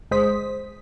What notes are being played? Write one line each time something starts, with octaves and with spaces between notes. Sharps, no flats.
G1 G#3 C5 D#6 B6